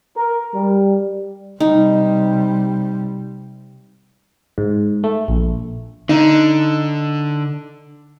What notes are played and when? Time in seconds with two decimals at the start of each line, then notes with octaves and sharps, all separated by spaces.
0.16 A#4
0.54 G3
1.60 C3 G3 D#4
4.58 G#2
5.04 A3
5.28 A#1
6.09 D3 D#4